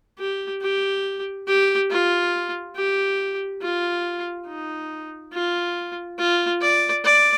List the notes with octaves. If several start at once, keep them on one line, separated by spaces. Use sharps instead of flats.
G4
G4
G4
F4
G4
F4
D#4
F4
F4
D5
D5